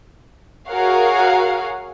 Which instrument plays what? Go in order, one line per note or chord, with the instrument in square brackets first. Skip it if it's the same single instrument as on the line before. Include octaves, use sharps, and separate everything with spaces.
[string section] F#4 G#4 A#4 C#5 F5 F#5